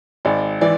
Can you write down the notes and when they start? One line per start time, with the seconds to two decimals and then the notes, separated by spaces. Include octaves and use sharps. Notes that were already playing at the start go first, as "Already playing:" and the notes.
0.25 G#1 D5
0.61 E3 D5